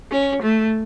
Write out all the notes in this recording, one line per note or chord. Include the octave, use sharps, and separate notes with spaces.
C#4
A3